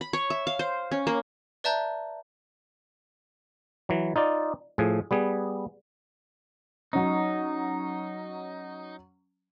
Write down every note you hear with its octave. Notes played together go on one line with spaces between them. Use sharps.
B5
C#5
E5
F5
C5
C#4
A#3
B4 D5 E5 A5 A#5 G6
E3 F#3
D#4 F4 D5
A2 F3 G#4
G3 B3 G#4
F#3 C#4 D#4